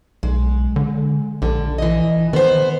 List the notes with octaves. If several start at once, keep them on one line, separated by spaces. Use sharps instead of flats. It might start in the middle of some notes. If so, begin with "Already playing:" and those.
B1 G#3
D3
A#1 D3
E3 D#5
D#3 B3 C5